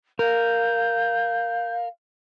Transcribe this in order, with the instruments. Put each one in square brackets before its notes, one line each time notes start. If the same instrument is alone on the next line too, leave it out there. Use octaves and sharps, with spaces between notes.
[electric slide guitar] A#4 [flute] F5 [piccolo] G6